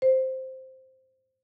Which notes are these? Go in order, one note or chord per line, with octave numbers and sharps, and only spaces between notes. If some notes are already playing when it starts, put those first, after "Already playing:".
C5